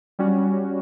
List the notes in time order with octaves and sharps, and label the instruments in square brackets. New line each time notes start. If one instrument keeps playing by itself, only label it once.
[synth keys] G3 C#4 F#4